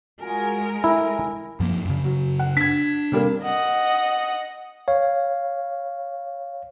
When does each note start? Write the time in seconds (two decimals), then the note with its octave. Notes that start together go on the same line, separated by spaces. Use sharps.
0.21 G#3 F4 F#4 A#4 G#5
0.84 E4 A4 G#5
1.60 F#2 F3 A#3
1.85 F#2 C#3
2.05 F#3
2.39 F#5
2.57 D4 G#6 B6
3.12 C3 G3 A#3
3.44 D#5 F#5
4.88 C#5 F5